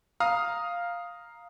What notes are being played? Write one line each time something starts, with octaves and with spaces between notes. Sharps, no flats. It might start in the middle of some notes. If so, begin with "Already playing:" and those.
F5 A#5 D#6 F6